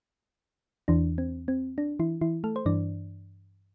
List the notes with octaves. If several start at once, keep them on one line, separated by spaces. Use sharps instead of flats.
E2 E3 D4
C4
C4
D4
E3 E4
E3 E4
A3 A4
C5
G2 E3 D4 D5